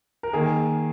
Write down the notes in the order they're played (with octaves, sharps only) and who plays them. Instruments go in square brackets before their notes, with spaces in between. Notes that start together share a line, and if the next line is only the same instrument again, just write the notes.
[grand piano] A#4
[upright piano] D#3 A#3 [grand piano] G#4